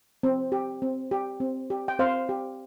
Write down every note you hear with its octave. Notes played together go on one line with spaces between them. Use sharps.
C4
G4
C4
G4
C4
G4
G5
C4 C5 F5
G4